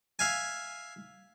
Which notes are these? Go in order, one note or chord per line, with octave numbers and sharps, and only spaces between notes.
E5 F5 G#5